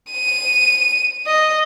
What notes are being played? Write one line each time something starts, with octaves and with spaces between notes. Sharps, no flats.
D#7
D#5